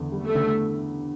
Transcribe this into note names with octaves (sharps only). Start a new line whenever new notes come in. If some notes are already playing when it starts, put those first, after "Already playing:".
Already playing: E2 D3
G3
A3
D3